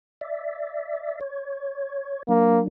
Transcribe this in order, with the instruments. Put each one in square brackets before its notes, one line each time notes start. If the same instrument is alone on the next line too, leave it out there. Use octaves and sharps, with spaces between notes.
[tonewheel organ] D5 E5
C#5
[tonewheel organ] F#3 D4 [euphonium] A#3